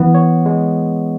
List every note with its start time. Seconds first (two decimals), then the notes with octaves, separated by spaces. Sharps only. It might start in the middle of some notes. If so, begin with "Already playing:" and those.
Already playing: E3 B3
0.15 C#5
0.46 G#3